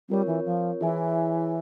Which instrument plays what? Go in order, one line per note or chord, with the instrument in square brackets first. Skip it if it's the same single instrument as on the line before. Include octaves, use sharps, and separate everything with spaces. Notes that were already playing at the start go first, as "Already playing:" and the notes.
[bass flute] G3 [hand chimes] C4 F4 A#4 C#5
[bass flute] E3
F3
[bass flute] E3 [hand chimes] E4 G#4 C#5 E5 G#5